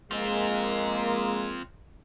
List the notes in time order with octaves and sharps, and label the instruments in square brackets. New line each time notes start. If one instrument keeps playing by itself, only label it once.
[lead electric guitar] F3 C4 [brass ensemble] G#3 A#3